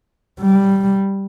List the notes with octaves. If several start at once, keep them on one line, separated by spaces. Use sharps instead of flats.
G3